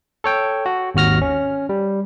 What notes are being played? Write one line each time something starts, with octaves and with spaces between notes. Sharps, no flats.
A4 C#5 G5
F#4
G#1 D#2 F#4 F6 A#6
C#4
G3